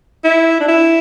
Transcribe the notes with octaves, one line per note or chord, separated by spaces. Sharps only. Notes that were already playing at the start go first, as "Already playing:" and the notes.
E4
D4
E4